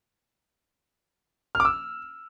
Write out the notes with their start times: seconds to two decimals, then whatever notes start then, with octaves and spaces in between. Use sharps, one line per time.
1.55 F6
1.60 D6
1.65 E6